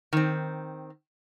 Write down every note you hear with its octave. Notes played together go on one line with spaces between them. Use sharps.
D#3 C4